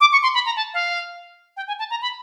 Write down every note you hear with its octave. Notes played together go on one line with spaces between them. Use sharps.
D6
C#6
C6
B5
A#5
A5
F5
G5
G#5
A5
A#5
B5